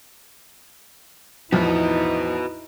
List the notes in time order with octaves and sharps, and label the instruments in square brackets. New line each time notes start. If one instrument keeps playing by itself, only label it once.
[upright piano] E2 A2 F3 [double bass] D#4 E4 [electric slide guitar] F#4 B4